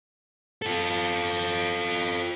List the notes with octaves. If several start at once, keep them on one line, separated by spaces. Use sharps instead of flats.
F4 A4